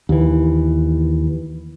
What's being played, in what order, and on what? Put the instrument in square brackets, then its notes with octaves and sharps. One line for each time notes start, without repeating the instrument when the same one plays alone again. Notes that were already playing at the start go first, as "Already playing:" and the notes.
[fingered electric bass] D#2 E3